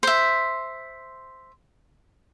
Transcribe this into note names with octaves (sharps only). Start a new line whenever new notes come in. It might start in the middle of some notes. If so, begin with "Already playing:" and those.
C5 E5